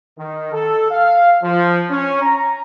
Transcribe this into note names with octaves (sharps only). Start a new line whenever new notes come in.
D#3
A4
F5
F3
C#4
A#5